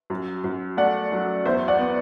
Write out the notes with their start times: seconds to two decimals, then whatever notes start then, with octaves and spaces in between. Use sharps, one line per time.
0.10 F#2
0.44 F#2
0.77 A3 D5 F#5
1.12 F#3
1.46 E2 C5 E5
1.68 D5 F#5
1.79 B3